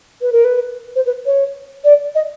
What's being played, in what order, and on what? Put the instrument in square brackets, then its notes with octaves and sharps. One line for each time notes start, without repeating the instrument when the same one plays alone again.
[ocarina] B4
A#4
B4
C5
B4
C#5
D5
D#5